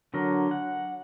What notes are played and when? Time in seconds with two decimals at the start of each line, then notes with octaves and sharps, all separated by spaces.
0.14 D3 F#3 A#4
0.51 F#5